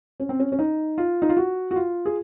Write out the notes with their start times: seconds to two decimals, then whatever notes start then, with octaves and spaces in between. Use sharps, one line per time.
0.20 C#4
0.29 C4
0.39 C#4
0.52 C#4
0.59 D#4
0.98 F4
1.22 D#4
1.29 F4
1.37 F#4
1.71 F#4
1.76 F4
2.05 G#4